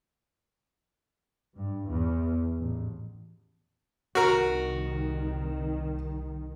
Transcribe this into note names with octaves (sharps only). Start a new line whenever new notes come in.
G2
E2
A1
C2 D#3 F#4 A#4